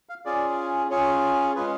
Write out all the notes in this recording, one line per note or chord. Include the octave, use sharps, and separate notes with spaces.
F5
C#4 F4 G#4 D5
C#4 F4 G#4 C#5
G#3 C#4 F4 G#4 B4